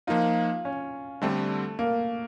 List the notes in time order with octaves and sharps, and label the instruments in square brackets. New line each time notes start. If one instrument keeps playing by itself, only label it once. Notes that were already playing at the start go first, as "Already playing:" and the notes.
[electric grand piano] F3 A#3 D#4 [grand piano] F4
[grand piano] C#4
[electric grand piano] D3 G3 C4 [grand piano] A3
[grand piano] A#3